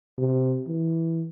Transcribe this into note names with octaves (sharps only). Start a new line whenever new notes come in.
C3
E3